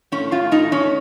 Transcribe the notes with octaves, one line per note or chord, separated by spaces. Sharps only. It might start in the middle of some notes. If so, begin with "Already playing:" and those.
A2 C#4
A2 F4
A2 D#4
A2 C#4